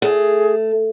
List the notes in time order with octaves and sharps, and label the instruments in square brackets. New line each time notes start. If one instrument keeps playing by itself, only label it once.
[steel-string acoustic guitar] A3 [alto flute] G#4